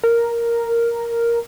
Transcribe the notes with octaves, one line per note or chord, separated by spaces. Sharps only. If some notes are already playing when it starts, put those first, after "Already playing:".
A#4